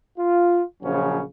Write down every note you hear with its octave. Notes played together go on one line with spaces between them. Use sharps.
F4
A#1 C#3 F3 F#3 C#4